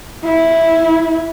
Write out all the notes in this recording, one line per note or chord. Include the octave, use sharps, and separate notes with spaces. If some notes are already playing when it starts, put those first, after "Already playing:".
E4